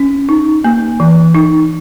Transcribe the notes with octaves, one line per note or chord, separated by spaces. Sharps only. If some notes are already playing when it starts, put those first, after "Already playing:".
Already playing: C#4
D#4
A#3
E3
D#4